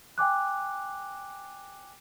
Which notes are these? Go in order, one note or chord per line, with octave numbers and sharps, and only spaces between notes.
G5 G#5 D6 F#6